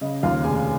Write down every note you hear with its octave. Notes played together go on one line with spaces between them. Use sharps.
C#3 D#5
D#2 F4 F5
F1 G#4 G#5